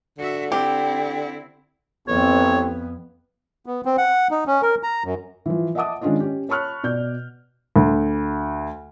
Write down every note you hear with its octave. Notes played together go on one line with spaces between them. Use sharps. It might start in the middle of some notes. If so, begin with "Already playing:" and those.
D3 F#4 E5
C4 E4 G4
A1 F2 B3 C4 C#5
B3
C4
F#5
D#4
C#4
A#4
A#5
F#2
E3 F3
D#5 E5 F#5 A5 D6 D#6
D#3 G#3 C#4 D4 F4 D#5
C#4 G4
C#5 A5 B5 C#6 F6 F#6
B2 D5 G6
D2